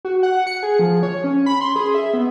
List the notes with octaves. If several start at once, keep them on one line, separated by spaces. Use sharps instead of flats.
F#4
F#5
C#7
G#4
F3
C#5
C#4
B5
C6
G#4
E5
B3